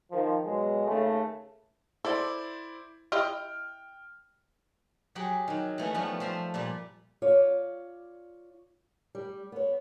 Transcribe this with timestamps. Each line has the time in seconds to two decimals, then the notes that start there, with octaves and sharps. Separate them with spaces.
0.11 D#3 F3
0.45 B2 F#3 G#3
0.87 D#2 C#3 A3
2.05 E4 A4 C5 D5
3.12 E4 G4 D#5 G5 F6
5.15 F#3 G4 G#4 F#5 G5
5.48 D#3 F#3
5.78 E3 A3 B3 C#4
5.94 F3 G3 A3 B3
6.20 F3 C5 E5
6.54 A#2 G3 G4
7.22 F4 C#5 D5
9.15 G3
9.52 B3 C#5